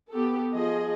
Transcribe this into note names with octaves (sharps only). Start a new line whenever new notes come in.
B3 G4 A4
F3 G#4 D#5